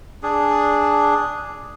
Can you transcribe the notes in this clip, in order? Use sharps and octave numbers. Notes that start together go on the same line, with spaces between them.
D4 G#4